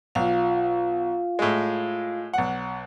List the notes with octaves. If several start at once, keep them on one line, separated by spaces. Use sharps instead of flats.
B1 F4 F5
A2 G#3
B1 F#5